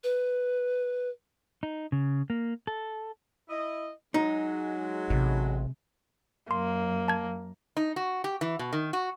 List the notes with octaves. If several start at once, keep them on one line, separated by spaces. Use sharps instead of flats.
B4
D#4
C#3
A#3
A4
E4 D#5
F#3 G#3 D#4
A1 C3
F#2 A#3 C6
A5 G#6
D#4
F#4
G4
E3
B2
D#3
F#4